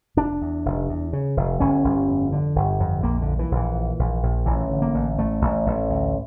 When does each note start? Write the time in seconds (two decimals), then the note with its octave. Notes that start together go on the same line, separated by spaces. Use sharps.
0.17 F1 D4
0.41 E2
0.65 F1
0.89 E2
1.13 C#3
1.37 F1
1.60 G1 C#4
1.84 G1
2.08 F2
2.32 D3
2.56 G1
2.80 F2
3.03 A#1 A#3
3.22 A#2 D3
3.39 E3
3.51 A#1 E3
3.74 A#2
3.99 A#1
4.23 A#1
4.46 A1 E3
4.71 D3
4.82 A#3
4.94 A1
5.18 A1 A3
5.42 A1
5.66 A1
5.90 D2